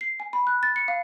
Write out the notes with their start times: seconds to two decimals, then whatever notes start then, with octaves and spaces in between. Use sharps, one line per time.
0.01 C7
0.20 G#5
0.33 B5
0.47 F#6
0.63 A6
0.76 C#7
0.88 F5